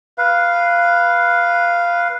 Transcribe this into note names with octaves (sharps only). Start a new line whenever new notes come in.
B4 F5